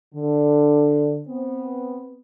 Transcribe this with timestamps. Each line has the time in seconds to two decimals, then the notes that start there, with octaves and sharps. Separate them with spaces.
0.15 D3
1.27 B3 C4